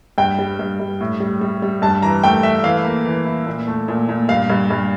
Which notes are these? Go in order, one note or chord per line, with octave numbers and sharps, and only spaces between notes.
G2 G5
G3
G2
G2
A2
G3
G3
G3
G2 A5
E3 A#5
A3 G5
A3 E5
E3 F5
A#3
E3
E4
A#2
A3
A#2
A#2
G2 F5
G2
G2